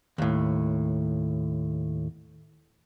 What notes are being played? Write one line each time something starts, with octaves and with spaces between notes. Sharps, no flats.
D#2 A2